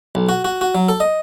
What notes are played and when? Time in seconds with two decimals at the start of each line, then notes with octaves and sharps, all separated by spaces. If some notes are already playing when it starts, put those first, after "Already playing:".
0.15 B1
0.29 F#4
0.45 F#4
0.61 F#4
0.75 F#3
0.89 A4
1.00 D#5